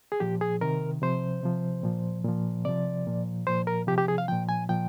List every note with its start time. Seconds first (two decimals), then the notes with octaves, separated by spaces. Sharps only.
0.12 G#4
0.20 A#2 F3 G4
0.41 G#4
0.61 C3 D#3 A#4
1.02 C3 F3 C5
1.43 C3 F3
1.83 A#2 F3
2.25 A#2 F3
2.65 C3 F3 D5
3.06 A#2 F3
3.47 A#2 F3 C5
3.67 A#4
3.87 C3 F3 G4
3.98 G4
4.08 G#4
4.18 F5
4.28 A#2 F3 G5
4.49 G#5
4.69 A#2 F3 G5